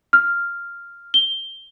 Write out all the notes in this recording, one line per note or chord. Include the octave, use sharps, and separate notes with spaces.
F6
G7